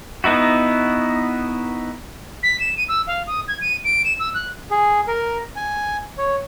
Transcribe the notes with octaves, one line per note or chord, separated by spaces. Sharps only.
B3 D#4 E4 F#4
B6
E7
D#7
E6
F5
D#6
G#6
D#7
D7
E7
E6
F#6
G#4
A#4
G#5
C#5